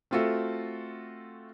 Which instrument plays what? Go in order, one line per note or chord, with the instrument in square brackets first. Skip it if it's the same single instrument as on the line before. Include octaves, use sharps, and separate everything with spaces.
[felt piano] A3 C4 F4 F#4 A4 E5